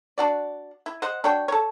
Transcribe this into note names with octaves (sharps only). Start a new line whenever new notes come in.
D4 F#4 D5
E4
C5 D#5 F#5
D4 F#4 C#5 G5
A4 C#5